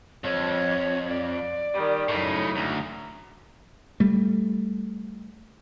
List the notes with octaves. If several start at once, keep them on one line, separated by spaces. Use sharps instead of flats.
F2 C#5
D5
D#3 G3
F#2 A2 C#3 D#4
D2 A#5
G3 A3